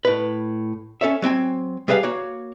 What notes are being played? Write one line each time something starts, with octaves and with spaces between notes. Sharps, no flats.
A2 B4
C#4 A4 C#5 E5
F#3 C4 G5 G#5
G3 G#4 B4 D#5 F5 G#5
A#3 F#4 C#5